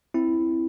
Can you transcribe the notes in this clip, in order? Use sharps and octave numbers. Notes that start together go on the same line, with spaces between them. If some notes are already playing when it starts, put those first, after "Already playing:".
C4 E4